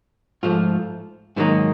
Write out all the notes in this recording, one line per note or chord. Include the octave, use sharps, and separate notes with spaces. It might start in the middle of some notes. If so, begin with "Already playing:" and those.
G#2 F3 A3 F4
G#2 D#3 F#3 A#3 D#4 E4